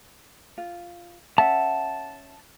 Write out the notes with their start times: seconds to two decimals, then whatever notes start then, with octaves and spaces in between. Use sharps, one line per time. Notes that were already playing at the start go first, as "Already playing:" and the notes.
0.58 F4
1.38 C#4 E5 F#5 A5